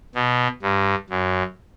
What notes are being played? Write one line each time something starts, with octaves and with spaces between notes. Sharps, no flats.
B2
G2
F#2